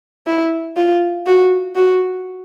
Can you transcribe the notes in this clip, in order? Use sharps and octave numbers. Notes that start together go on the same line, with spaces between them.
E4
F4
F#4
F#4